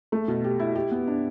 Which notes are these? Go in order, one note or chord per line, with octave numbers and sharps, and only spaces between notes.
A3
B2
G4
E4
G4
B3
D4